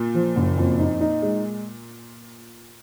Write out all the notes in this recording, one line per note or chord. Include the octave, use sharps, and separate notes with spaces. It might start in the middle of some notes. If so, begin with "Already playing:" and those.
Already playing: A#2
F3
F#1
F2
D#4
D#4
G#3